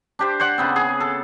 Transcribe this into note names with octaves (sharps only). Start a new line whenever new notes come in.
D4 G4 C5
C5 D5 F#5
C#3 B3 C4
G#4
A4